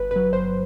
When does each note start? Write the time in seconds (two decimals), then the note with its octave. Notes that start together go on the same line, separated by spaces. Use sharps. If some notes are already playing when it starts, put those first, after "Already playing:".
Already playing: G1 B4
0.11 G2 F#3 B4
0.33 G1 C5